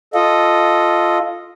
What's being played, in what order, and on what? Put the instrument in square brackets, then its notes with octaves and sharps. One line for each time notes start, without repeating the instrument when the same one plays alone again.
[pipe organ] F4 [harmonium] A4 D#5